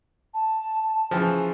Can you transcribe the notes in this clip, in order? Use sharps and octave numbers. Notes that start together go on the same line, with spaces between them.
A5
C#3 E3 F3